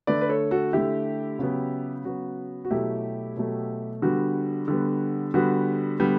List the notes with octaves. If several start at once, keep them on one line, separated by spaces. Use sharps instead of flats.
D3 A3 B4 D5
B4
A4 C#5
F#4 A4
D3 A3 E4 G4
C#3 F#3 B3
C#3 F#3 B3 F#4
F#4
B2 F#3 A3 E4 G4
B2 F#3 A3
D3 G3 B3 F#4
D3 G3 B3
D3 G3 B3 F#4
D3 G3 B3